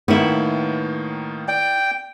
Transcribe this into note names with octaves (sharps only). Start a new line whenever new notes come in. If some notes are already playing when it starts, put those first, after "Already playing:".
A2 D#3 A#3 B3 E4
D5 G5